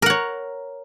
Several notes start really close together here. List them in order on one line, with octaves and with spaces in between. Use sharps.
A#4 F#5 C#5